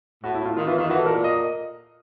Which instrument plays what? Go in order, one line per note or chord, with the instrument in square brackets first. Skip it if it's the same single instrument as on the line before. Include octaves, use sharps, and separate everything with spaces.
[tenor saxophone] A2 [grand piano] F#4
[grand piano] E4
[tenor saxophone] A2
[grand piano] F4
[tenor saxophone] D#3 [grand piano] F4
[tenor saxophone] E3 [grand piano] F4
[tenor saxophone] D#3 [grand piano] F4
[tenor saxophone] E3 [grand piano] F#4
[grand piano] A4
[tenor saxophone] A#2 [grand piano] A#4
[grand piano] D#5